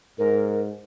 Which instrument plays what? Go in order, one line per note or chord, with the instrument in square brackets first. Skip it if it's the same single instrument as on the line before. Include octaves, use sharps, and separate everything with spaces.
[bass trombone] G#2 [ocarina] A#4